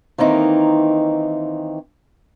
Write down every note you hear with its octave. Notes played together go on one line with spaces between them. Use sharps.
D#3 E3 A#3 C4 D#4